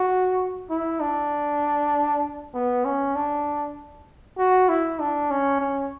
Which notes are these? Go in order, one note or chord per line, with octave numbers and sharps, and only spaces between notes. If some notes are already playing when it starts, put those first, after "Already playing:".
Already playing: F#4
E4
D4
B3
C#4
D4
F#4
E4
D4
C#4
C#4